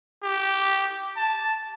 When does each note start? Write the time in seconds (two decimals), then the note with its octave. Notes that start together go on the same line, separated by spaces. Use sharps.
0.24 G4
1.17 A5